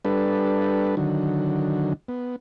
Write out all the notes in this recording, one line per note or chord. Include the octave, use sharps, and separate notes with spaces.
G3 D4 A4 B4
D3 D#3 F#3
B3